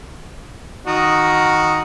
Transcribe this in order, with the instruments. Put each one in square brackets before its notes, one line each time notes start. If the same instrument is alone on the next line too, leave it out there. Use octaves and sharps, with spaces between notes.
[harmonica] D#3 D#5 A#5 [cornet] F#4